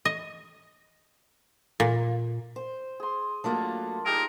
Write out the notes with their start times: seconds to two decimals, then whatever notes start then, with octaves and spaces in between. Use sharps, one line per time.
0.05 D#5
1.80 A#2
2.56 C5
3.00 G#4 C6
3.44 F#3 A3 A#3 D4 F4
4.06 D#4 G4 G#4 A#4